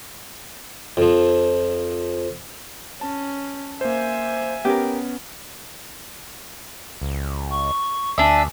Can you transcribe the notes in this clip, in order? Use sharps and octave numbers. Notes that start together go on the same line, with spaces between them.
F2 F3
C#4 A5
A#3 C5 E5 G#5
B3 C#4 G4 A#4
C#2
C#6
D2 D4 E5 G#5